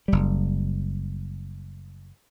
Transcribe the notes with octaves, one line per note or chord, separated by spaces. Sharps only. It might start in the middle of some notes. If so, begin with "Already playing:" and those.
F#1 G3